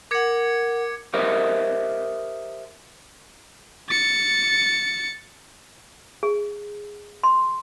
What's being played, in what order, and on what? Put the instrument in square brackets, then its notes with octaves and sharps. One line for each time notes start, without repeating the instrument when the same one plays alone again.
[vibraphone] A#4 F#5 [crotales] D6 G#6 C#7
[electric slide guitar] G4 A#4 C5 D#5 E5
[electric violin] A6 C#7
[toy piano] G#4
C6